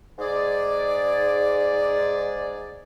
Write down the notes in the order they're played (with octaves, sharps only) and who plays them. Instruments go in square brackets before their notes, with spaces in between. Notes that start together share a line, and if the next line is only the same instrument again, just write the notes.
[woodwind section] G#2 G#4 D5